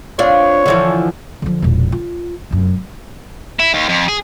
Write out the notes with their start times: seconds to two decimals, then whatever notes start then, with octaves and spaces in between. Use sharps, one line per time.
0.19 C4 D4 F4 C#5
0.66 D3 E3 F3
1.42 D3 F3
1.62 E1 A#1
1.92 F4
2.51 F1 F#2
3.59 E4
3.73 D#2
3.89 F2
4.08 G#4